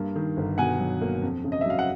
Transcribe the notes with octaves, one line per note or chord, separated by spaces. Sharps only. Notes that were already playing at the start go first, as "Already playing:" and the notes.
Already playing: G2 A#3
D#3
G1
B2 F#5 G#5
F#3
A#3
F2
C#3
D#5
E5
F#3 F5
F#5